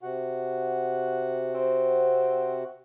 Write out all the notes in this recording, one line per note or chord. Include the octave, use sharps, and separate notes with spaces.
C3 F#4 F#5
C4